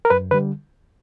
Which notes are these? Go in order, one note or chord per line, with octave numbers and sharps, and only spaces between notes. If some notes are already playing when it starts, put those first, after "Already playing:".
A#4
F#2 B4
D3 G3 B4